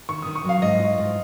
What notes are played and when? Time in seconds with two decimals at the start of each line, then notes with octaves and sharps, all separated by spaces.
0.09 D#3 C#6
0.22 D#3 D#6
0.36 C#6
0.45 F#3 F5
0.62 G#2 D#5
0.80 F4
0.98 G#2